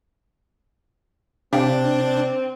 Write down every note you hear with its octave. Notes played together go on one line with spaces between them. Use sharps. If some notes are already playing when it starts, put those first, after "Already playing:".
C3 C4 D4 G4 F5 G5